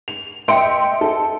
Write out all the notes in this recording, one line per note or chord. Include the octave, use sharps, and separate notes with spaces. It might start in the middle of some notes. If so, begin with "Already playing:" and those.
F7
D#5 E5 G5 C6 C#7 D7
A4